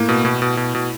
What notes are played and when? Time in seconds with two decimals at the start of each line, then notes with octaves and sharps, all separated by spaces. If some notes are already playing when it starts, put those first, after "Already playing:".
Already playing: A2 A#3
0.09 B2
0.25 B2
0.42 B2
0.57 B2
0.75 B2